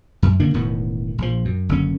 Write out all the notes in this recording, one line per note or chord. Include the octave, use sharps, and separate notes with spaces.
F#2
D3 D#3 A#3 D4
E1 A2 D#3 B3
A#1 F3
F#2
F#1 D3 C#4